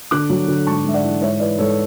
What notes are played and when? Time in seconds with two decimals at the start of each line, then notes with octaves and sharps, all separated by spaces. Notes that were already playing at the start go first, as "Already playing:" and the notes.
0.11 D3 D6 F#6
0.30 F#3
0.48 D3
0.67 G#2 A5 C#6
0.85 G#2 E5
0.94 D5 F#5
1.04 E3
1.22 G#2 C#5 E5
1.40 E3 B4 D5
1.58 G#2 A4 C#5